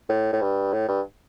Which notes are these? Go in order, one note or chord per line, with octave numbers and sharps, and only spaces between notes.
A2
A2
G2
A2
G2